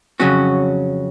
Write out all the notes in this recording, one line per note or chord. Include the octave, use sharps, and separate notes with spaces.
F2 C#3 F#3 C#4 F#4